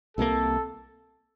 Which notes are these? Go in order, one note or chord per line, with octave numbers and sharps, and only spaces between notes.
C2 C3 F3 A#3 A4